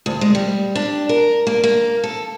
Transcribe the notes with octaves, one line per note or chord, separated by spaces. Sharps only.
D2
G#3
G3
D4
A#4
A#3
A#3
A4